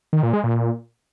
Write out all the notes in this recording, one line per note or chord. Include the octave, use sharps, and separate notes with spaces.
D#3
A#2
G#3
A#2